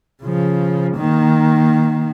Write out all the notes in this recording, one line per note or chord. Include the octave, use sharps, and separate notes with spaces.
C#3 F3
D#3 A#3